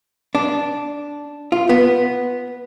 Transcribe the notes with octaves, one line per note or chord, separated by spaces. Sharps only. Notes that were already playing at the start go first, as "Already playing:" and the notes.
D4
F4
B3